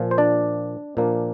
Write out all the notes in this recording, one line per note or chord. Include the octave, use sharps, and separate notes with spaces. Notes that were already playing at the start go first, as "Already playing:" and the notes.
Already playing: A#2 F3
C5
D4 D5
A#2 F3 A#3 D4